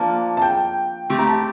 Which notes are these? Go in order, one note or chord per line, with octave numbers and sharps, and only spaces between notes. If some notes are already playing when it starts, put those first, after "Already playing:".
Already playing: F3 A#3 D4 A5
A5
G5
A3 C4 G4
A#5
A5